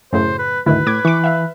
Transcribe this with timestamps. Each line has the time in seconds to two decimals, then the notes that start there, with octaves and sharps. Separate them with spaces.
0.13 F#2 A2 C#3 C5
0.39 B4
0.66 D2 G#2 D#3 E4 B4
0.87 A2 D6 G#6
1.05 E3 C#6 D6
1.24 E5 F5